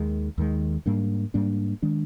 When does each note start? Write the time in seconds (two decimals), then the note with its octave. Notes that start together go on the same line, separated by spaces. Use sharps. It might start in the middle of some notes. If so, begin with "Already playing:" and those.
Already playing: D#2 D#3 G#3
0.38 D#2 D#3 G#3
0.86 G#2 G3 A#3 D4
1.34 G#2 G3 A#3 D4
1.82 D#3 G#3 D4